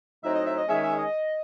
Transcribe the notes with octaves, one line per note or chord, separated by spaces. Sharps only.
A2 F#3 C4 D#4 E5
D#5
E5
D#5
D#3 G#3 C#4 G#4 E5
E5
D#5